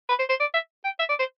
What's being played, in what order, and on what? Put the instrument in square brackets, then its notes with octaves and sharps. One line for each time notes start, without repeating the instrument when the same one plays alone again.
[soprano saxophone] B4
C5
C5
D5
E5
G5
E5
D5
C5